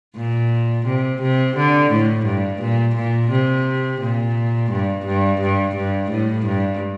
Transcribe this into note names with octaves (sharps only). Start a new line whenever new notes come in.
A#2
C3
C3
D3
A2
G2
A#2
A#2
C3
A#2
G2
G2
G2
G2
A2
G2